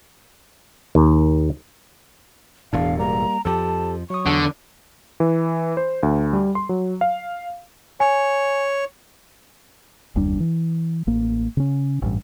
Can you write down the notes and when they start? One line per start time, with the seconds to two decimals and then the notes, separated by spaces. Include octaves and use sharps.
0.95 D#2
2.73 E1 E2 A2 D4 F5
2.99 G3 A#3 A#5
3.45 F2 F3 G4 A4 A5
4.10 F#3 C#6 D#6
4.26 E2 D3
5.20 E3
5.77 C5
6.03 D2
6.33 G3
6.55 C6
6.69 F#3
7.01 F5
8.00 C#5 G#5
10.16 F#1 D#2 G3 D4
10.40 E3
11.07 A1 A#3
11.57 C#3 C#4
12.02 A1 G2